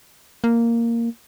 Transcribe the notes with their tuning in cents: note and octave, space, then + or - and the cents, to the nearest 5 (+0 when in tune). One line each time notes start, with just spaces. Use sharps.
A#3 -5